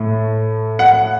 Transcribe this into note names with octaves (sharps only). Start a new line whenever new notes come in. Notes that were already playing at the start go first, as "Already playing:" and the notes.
Already playing: A2 A3
F#5